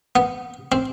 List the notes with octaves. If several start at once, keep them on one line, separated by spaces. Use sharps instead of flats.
B3
C4